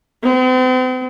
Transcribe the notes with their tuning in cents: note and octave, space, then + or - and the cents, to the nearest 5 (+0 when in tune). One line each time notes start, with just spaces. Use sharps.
C4 -40